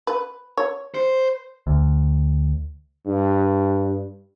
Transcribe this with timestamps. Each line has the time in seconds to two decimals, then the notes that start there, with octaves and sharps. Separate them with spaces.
0.07 B4
0.58 C#5
0.95 C5
1.67 D2
3.06 G2